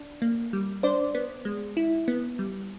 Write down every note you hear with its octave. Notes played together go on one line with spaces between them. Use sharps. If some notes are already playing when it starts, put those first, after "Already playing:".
Already playing: D4
A#3
G3
D4 C5 D5
B3
G#3
E4
B3
G3